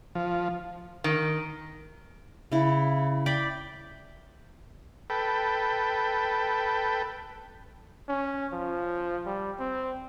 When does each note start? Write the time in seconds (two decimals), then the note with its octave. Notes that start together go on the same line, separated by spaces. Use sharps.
0.15 F3
1.04 D#3
2.52 C#3 E4
3.26 D5 G5 B5
5.10 A4 B4 G5
8.08 C#4
8.53 F3
9.26 G3
9.59 C4